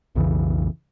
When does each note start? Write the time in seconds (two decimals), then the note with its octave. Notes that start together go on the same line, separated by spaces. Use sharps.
0.15 B1 F2 C#3 E3